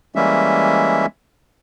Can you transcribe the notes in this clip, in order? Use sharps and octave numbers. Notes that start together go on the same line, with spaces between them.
E3 G3 G#3 A#3 C#4 E5